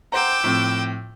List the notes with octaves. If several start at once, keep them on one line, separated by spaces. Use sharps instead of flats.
C5 F#5 G5 A#5 D6 E6
A2 F3 C4